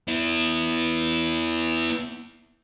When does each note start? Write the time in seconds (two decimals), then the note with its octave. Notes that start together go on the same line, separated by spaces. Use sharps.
0.08 B3 E4